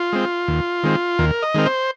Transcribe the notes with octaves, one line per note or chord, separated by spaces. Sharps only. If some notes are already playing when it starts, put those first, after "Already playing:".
Already playing: F4
G#3 C4
D#2
D#3 G#3 C4
D#2 A#4
D#5
D#3 G#3 C4 A#4
C5